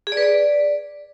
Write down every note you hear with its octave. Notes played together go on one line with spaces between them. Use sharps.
G#4
D5
B4
D5